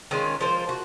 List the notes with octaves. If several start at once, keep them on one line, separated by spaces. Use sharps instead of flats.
D#3 G#3 C#4 F4
F3 A#3 F4 C5
F#4